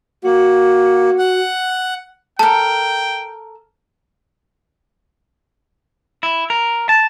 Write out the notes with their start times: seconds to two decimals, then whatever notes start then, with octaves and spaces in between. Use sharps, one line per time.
0.24 A#3 F#4
1.19 F#5
2.39 A4 A#4 G5 A5
6.23 E4
6.50 A#4
6.89 A5